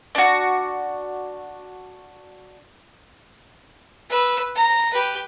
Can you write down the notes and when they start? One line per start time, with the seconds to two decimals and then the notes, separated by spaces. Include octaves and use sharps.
0.15 D4 F#4
4.09 B4 E6
4.55 A#5
4.93 G4 B4